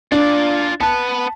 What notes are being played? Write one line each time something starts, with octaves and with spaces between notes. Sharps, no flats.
D4 F4 D5
B3 B4 A5